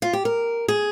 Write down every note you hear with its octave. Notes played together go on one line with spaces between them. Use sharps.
F4
G4
A#4
G#4